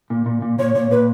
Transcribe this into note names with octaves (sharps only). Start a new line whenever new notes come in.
A#2
A#2
A#2
A#2 C#5
A#2 C#5
A#2 B4